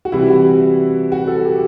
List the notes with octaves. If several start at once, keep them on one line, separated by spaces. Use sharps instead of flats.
F#4
C3 E3 G3 E4
F#4
F#4
A4
G4